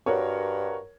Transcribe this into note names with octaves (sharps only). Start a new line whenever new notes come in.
G2 F#4 A#4 C#5